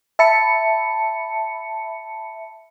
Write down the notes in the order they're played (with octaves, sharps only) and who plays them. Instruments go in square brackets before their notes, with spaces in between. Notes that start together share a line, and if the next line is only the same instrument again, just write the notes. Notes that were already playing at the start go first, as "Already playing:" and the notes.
[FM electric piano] E5 A5 B5 C#7